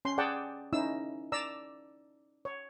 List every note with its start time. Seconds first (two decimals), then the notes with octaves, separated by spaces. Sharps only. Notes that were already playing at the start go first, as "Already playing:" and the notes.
0.05 C#4 C6
0.18 G#4 D5 F#5 G5 A5
0.73 C#4 D#4 E4 E6
1.32 D5 A#5 E6
2.45 C#5